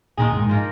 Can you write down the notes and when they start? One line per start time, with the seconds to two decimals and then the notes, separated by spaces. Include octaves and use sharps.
0.17 F2 A#2 D#3 G#3 D#4 G#4
0.33 G#2
0.49 F3 A#3 D#4